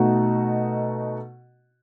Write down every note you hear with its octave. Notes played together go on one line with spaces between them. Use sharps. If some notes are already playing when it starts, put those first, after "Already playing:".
Already playing: B2 A3 D#4 F#4